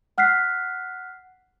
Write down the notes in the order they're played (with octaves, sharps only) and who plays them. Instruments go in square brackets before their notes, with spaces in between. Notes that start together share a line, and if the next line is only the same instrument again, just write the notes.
[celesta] F#5 F6 F#6 B6 C7